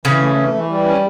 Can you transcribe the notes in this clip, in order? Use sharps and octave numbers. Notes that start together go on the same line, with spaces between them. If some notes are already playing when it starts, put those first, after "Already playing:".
C#3 E3 C#4
A3
E3
E3
G3
C#4